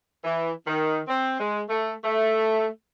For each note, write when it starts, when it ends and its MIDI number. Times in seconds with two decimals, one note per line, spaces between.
0.24 0.51 52
0.67 1.00 51
1.08 1.37 60
1.40 1.62 56
1.69 1.92 57
2.04 2.66 57